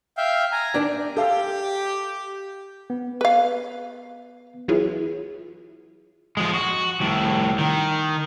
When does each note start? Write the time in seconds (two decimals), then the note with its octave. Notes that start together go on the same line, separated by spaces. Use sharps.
0.18 E5 F5 G5
0.52 G#5 A#5
0.74 D#3 D4
1.17 G4 A4 F5
2.90 B3
3.21 B4 F5
4.68 E3 F#3 E4 F4 G#4
6.37 F3 G#3
6.54 F#4
7.00 C2 A2
7.58 D#3